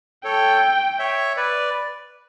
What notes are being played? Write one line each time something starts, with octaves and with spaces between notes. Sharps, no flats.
A4 C#5 G5
C#5 E5
B4 D5